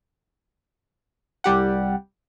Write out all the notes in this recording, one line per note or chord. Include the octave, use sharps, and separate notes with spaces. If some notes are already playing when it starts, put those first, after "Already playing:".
C2 G3 G4 F#5